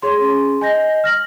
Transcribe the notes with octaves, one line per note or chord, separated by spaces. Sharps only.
G#4 C#5 C6
C#4
D#5 G#5 G6 A#6
F6 A#6 F#7